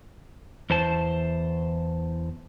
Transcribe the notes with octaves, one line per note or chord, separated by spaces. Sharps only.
E2 C5 A5